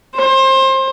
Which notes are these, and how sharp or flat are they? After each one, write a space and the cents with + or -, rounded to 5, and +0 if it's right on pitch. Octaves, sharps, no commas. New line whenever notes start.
C5 +25